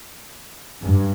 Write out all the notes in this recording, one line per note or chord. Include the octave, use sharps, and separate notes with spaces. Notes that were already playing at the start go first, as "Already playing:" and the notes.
G2